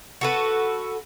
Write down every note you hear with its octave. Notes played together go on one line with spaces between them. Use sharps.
F#4 A4 B4